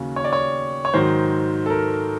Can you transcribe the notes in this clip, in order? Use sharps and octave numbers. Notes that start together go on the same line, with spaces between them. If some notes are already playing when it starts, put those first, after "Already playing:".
Already playing: D#2 C#3 F#3
C#5
D5
C#5
C#5
G#2 D#3 F#3 C5
A4
A#4